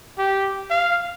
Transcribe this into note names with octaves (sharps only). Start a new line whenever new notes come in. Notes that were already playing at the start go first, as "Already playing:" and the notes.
G4
F5